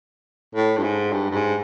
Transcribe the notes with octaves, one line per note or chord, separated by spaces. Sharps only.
A2
G2
G#2
G2
G2
G#2